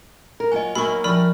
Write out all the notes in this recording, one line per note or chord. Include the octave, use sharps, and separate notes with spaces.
A#4
F#3 A#3 F4 D#5 G#5
F#3 A#3 D#4 F#4 G#5 B5 C#6 E6
F3 G3 A#4 D5 A5 B5 C#6 F6